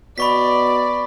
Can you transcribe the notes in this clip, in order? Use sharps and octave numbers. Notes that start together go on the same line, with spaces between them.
B2 D5 B5 C#6 B6